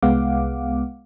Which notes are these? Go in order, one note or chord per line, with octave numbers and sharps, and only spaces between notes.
C2 G#3 B3 F5 F#5 D6